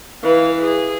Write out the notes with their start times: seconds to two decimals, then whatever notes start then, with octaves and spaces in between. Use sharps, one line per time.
0.23 E3 F5
0.62 G#4